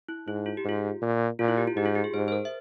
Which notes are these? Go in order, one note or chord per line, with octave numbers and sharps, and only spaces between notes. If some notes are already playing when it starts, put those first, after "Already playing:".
E4
G#2 E4
F4
G4
G#2 F4
A#2
A#2 F4
E4
G4
F4
G#2 G4
F4
G4
G#4
G#2 C5
C5
A#4
E5